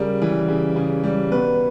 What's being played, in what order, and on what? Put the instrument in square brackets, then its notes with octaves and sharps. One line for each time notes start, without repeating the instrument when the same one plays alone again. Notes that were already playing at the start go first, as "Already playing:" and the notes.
Already playing: [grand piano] C#3 G3 A#4
E3
C#3
C#3
G3
B2 B4